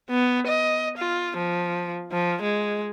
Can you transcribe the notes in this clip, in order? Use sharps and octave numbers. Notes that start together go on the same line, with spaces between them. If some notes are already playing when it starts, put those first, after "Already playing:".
B3
D#5
F4
F3
F3
G#3